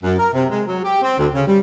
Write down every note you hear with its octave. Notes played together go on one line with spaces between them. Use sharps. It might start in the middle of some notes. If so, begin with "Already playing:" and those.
F#2
A#4
C3
G#3
F#3
G4
C4
D2
C#3
G3